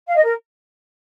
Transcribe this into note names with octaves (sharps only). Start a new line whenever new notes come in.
F5
D#5
A#4